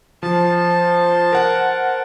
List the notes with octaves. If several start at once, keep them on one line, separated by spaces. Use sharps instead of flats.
F3 C5 A5
A#4 F#5